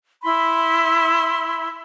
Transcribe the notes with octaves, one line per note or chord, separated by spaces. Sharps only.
E4 B5 C6